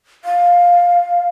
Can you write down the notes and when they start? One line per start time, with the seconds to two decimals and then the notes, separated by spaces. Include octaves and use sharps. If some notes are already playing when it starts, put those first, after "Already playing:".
0.25 F5